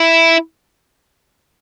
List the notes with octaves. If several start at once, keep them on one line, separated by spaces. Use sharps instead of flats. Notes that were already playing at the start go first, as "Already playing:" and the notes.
Already playing: E4